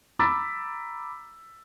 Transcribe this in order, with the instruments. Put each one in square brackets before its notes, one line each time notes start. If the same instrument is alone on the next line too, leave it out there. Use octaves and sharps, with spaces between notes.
[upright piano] A#5 B5 D6 E6 A6 B6